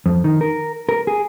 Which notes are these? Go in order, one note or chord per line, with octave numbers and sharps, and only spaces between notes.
F2
D#3
A#4
A#4
G#4